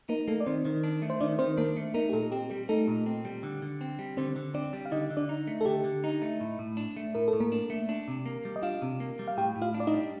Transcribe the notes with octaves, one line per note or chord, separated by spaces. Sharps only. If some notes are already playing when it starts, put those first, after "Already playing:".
A#3 D#4 A#4
A3 A#3 A4
D5
D#3 C4 C5
D#3
D4
A3
C5
D#3 D4 D5
D#3 C4 C5
A#3 D4 A#4
A3
A#3 D#4 A#4
G4
A#2 A3 A4
C4 G4
G3 G4
A3 D#4 A4
A#2
C4
G3
D3
D3
C4
G3
D3 C4 C5
D3
C4 D4 D5
G3
F5
D3 D#4 D#5
D3
D4 D5
D#4
A3
A4
D3 G4
D3
D#4
A3
A2
A2
D4
A3
A2 A#4
A4
A2
A#3 A#4
D4
A3
D4
C3
A#3
G3
D#5
D4 F4 F5
C3
A#3
G3
F5
A2 G4 G5
A2
F4 F5
D4
D5
D#4 D#5
G3